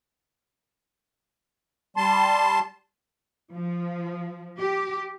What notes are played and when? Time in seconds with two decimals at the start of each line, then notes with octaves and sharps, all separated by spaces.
1.97 G3 A5 C6
3.53 F3
4.59 G4